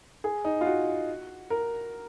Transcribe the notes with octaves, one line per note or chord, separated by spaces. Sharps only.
G#4
D#4
F4
F#4
A#4